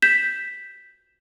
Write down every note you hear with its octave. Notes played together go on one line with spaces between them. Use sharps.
G6 B6 E7